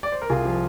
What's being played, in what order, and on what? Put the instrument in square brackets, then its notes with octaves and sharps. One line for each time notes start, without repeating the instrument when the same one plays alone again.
[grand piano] D5
C5
A#4
C2 F4 G#4
F3